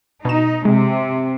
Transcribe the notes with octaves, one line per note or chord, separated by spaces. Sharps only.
B2 D#4 E7
C3 G#3